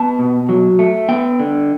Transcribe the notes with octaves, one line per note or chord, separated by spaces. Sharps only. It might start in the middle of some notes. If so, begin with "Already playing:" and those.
Already playing: B3 A5
B2
F#3
A3
B3 G5
D3